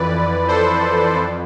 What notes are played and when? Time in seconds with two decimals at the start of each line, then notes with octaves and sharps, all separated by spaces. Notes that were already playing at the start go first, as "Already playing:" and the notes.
Already playing: F2 E3 B4 D5
0.48 A4 C5
1.15 F2